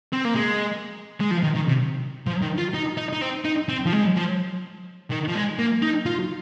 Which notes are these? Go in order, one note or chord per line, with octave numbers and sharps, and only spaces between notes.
C4
A#3
G#3
G#3
F3
D#3
D#3
C3
F3
D#3
F4
D#4
D#4
D#4
C4
D#4
C4
F3
G#3
F3
D#3
F3
G#3
A#3
D#4
F4